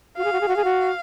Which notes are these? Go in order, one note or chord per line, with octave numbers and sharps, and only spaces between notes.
F#4 F5
G#4
F#4
G#4
F#4
G#4 F5
F#4